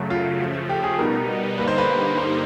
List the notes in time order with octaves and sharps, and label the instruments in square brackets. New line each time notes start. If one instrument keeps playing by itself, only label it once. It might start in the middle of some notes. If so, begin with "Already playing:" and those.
Already playing: [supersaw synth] F#2 C#3 F#3 A3
[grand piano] F4
[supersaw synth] C#3 F3 A3
[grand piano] G4
G#4
[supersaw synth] B2 G3 B3 D#4 [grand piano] A#4
[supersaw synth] G2 D3 G3 A#3 D#4 [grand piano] B4
[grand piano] C5
B4
C5